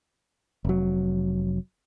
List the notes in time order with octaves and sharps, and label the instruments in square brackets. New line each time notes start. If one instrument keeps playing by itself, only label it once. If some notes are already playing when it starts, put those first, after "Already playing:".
[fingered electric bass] F1 F#3